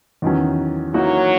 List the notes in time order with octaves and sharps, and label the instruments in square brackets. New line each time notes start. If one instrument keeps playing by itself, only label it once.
[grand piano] E2 D#3 F#3 C#4
[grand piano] E3 A#3 D#4 F#4 [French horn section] F#3